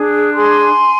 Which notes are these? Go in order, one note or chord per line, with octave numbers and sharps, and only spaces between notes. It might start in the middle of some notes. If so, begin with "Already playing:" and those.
Already playing: D4 G#4
G#4 G#5 C6